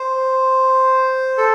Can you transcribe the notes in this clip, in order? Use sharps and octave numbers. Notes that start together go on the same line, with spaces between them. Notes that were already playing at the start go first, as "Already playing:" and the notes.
Already playing: C5
A4